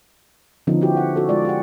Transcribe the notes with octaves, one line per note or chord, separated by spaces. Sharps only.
D3 F3 B3 C#4 D#4
E4 F#4 G4
F#5
F#4 A4
G#3 F4 D5
G4 G#4 F#5